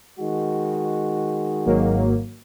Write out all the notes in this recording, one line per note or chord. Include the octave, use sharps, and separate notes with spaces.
D#3 G#3 F#4
G#1 F#3 A#3